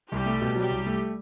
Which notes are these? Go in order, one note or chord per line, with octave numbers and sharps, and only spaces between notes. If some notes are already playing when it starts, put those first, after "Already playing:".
C2 G3 G4
A3
B2
F#3 G3 G4
C2
A3